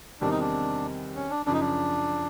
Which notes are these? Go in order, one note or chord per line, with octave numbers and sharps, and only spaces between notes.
E2 C3 D#3 G3 C4 D4
D#4
D4
C#4
D4
F#2 C#3 F3 D4
D#4
D4